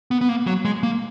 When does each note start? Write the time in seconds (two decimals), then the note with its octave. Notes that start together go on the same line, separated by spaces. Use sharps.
0.11 B3
0.21 B3
0.29 A#3
0.47 F#3
0.65 G#3
0.83 A#3